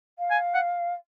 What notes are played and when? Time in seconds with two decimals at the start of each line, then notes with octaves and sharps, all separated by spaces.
0.19 F5
0.31 G#5
0.55 F#5